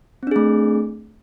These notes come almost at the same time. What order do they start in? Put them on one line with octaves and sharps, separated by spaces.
C4 D4 G#4 A3